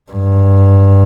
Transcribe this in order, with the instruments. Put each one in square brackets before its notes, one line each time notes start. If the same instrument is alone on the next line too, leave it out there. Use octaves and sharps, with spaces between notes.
[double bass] G2